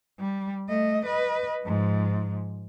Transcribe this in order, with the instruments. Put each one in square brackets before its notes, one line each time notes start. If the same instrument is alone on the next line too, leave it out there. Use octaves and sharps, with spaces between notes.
[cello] G3
A3 D#5
B4 D#5
G#2 F3